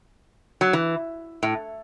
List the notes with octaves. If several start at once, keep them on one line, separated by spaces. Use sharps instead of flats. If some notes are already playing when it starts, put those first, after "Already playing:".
F#3
E3
A2